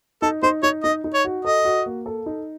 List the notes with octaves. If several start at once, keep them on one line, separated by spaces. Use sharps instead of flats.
D#4 A4
D#4 C5
D#4 C#5
D#4 D#5
D#4
C#5
F#4
A4 D#5
F#4
A#3
A4
D#4